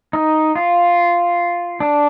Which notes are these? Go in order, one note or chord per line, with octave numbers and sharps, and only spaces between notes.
D#4
F4
D4